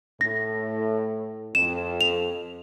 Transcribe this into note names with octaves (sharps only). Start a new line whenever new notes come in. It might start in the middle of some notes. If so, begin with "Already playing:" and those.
A2 A#6
F2 E7
F7